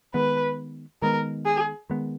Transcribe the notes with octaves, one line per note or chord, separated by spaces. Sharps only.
D#3 G#3 B3 B4
D#3 G#3 B3 A#4
G#4
D#3 G#3 B3